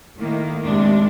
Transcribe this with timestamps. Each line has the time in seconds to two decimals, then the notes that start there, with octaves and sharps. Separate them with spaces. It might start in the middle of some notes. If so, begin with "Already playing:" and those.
0.16 A2 D#3 A#3
0.64 D#2 C3 G#3 D4